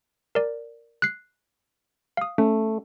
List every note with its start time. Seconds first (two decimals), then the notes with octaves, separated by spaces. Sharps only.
0.35 A#4 D5
1.02 F#6 C7
2.17 F5 D#6
2.38 A3 C#4